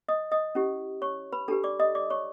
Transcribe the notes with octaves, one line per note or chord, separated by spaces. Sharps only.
D#5 D#6
D#5 D#6
C#4 E4 G4
C#5 C#6
B4 B5
D4 G4 A4 B4 A5
D5 D6
D#5 D#6
D5 D6
C#5 C#6